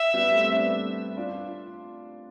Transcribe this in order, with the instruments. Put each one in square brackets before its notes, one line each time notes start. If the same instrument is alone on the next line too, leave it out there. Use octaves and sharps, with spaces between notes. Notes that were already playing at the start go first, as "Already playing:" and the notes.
Already playing: [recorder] E5
[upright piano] G3 B3
A3 C4
B3 D4
D4 F4